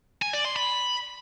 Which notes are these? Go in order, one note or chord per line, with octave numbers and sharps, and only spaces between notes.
G#5
D5
C6
B5